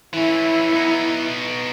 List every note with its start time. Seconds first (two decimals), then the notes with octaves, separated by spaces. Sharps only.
0.13 E3 C#4 E4
0.73 B3 D#4